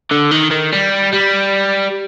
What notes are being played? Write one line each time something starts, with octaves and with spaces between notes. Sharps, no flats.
D3
D#3
D#3
G3
G3